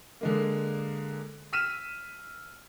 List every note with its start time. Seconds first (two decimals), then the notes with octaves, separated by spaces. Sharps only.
0.21 D3 G#3 A#3
1.53 E6 F6 B6 D#7 E7